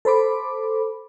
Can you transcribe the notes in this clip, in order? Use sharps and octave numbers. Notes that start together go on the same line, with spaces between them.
A4 C5 B5 D6